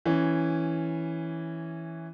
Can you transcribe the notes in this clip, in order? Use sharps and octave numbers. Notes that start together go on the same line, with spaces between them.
E3 C#4